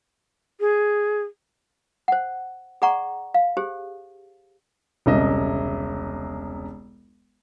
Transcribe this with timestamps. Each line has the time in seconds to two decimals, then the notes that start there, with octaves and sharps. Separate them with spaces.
0.60 G#4
2.08 C5 F#5
2.82 G#4 D5 F#5 A#5 C#6
3.34 F5
3.57 G4 G#4 C5
5.06 E1 C2 C#3 D#5 E5